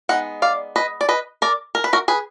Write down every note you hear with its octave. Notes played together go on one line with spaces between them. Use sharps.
G#3 B3 D#4 F#5
D5 F5
B4 D#5
D5
B4 D#5
A#4 D5
A#4
B4
F#4 A#4
G#4 B4